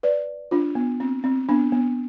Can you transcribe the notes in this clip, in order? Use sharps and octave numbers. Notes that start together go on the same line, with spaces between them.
B4 D5
D4 F4
B3
C4
C4
B3 D4
B3